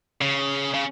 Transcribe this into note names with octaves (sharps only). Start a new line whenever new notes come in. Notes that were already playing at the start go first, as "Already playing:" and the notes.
C#3
C#3